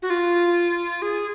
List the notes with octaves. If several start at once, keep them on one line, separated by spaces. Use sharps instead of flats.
F#4
F4
G#4